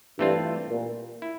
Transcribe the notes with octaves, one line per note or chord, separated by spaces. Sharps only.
G2 E3 A3 C4 F4
A#2
E4